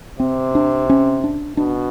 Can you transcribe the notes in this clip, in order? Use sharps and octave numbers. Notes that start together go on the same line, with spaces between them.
C3 C4
D4
C#4
D4
B2 D4